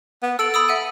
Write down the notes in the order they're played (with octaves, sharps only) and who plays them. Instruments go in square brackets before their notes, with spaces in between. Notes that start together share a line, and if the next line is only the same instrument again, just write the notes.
[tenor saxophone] B3
[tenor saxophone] A4 [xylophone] E6 D7 F#7
[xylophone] B5 D#6 E6
E5 F#5 D#7